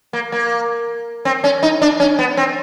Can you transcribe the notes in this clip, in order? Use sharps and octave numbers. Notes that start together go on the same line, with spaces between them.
A#3
A#3
C4
C#4
D#4
D4
C#4
B3
C4